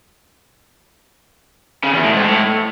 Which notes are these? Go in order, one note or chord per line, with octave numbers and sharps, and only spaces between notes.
C#3
E2
A2
G#2
A2